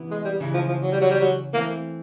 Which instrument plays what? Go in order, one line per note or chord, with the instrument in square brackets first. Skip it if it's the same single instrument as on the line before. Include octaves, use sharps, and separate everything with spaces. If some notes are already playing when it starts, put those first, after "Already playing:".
Already playing: [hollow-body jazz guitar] C3 E3 B3 E4
[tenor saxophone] G#3
G3
[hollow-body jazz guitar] C#3 E3 G#3
[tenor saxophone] F3
F3
F#3
G3
F#3
G3
F#3
[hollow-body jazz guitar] E3 A3 C4 [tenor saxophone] A#3